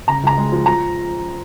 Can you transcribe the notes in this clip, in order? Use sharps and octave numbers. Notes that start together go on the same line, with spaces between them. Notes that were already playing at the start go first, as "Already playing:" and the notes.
C#3 A#5
C#2 A#5
G#3
F3
F3 A#5